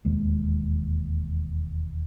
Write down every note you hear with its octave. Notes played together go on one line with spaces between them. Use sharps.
E1 D#2 G#3